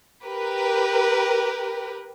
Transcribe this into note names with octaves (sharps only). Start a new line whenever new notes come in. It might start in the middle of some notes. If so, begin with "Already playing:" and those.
G4 A#4 B4